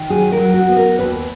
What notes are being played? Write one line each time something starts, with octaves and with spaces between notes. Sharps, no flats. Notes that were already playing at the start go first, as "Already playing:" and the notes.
Already playing: D#3
F#3 G#4
A#4
F#3
F#4
B3
A#4
D#2 B4